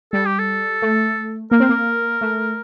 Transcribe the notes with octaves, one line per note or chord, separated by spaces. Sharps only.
G3 A4
G4
A4
A3
A#3 A#4
C4
A#3
A3